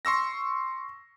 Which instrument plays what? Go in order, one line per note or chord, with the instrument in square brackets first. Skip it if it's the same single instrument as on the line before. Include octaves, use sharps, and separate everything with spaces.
[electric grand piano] C6 C#6 E6 A#6